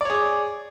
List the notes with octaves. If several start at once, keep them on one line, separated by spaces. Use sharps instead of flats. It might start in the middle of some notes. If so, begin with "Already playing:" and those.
G#4 C#5 D5 D6